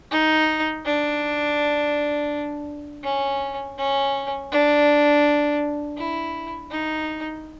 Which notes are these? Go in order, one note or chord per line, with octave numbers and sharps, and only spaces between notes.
D#4
D4
C#4
C#4
D4
E4
D#4